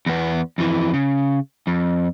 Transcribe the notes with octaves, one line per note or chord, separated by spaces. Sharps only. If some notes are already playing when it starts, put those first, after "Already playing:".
E2 B3
F2 E3
C#3
F2